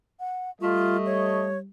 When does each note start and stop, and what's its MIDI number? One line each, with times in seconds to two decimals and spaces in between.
0.20 0.50 78
0.61 1.69 55
0.61 1.46 57
0.61 0.97 65
0.61 1.46 75
1.06 1.58 73